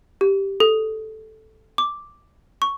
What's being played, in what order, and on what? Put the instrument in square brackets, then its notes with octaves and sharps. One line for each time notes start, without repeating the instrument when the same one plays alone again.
[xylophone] G4
A4
D6
C#6